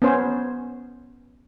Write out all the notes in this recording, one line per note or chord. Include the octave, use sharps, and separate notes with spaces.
B3 C#4 C5